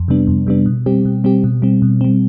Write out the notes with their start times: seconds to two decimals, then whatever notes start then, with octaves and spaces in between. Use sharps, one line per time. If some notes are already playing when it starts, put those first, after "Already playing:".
Already playing: F2
0.08 C3 G3 B3 D4
0.27 F2
0.47 C3 G3 B3 D4
0.66 B2
0.86 G3 C4 G4
1.05 B2
1.24 G3 C4 G4
1.44 B2
1.62 G3 C4
1.82 B2
2.01 G3 C4